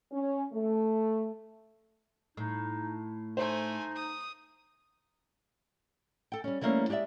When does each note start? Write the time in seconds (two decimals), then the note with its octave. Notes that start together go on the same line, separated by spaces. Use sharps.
0.12 C#4
0.53 A3
2.37 A2 D#4
3.37 A3 D#4 C5 G#5
3.96 D#6
6.32 A4 G5
6.44 G3 C#4
6.61 E3 G3 A3 A#3 C#4 C5
6.89 G#3 G4 C#5 D5 E5